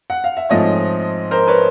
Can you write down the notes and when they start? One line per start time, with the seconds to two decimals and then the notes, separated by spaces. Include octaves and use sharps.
0.10 F#5
0.24 F5
0.37 E5
0.49 G#2 F3 A3 C4 C#5 D#5
1.31 A#4 C5
1.48 B4 C#5